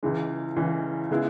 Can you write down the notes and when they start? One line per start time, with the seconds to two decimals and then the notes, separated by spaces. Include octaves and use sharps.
0.03 C#2 C#3 E3 G#3
0.56 C#2 C#3 E3 G#3
1.11 C#3 G#3 B3 E4